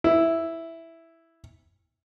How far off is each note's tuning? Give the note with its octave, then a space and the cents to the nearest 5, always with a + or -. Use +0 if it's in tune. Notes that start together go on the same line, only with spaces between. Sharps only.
E4 +0